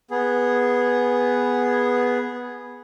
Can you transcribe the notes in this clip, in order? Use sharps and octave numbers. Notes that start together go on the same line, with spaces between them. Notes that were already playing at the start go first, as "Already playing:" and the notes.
B3 G#4